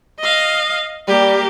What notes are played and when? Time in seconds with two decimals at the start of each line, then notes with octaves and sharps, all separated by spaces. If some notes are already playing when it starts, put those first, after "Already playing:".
0.20 D#5 F5
1.08 G3 A#3 G4